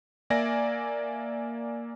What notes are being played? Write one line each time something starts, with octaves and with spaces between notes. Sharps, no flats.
A#3 D5 E5 G#5 A#6